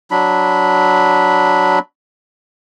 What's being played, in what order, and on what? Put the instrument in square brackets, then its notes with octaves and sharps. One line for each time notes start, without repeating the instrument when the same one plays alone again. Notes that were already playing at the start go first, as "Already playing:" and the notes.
[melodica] F#3 D4 B5